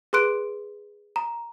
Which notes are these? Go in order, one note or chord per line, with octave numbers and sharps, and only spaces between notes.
G#4 B4 C6 F#6 D7
A#5